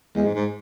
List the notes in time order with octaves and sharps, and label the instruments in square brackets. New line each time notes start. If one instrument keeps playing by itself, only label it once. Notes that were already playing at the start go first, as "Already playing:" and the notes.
[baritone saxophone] E2 [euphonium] G#3
[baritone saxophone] G#2
G#2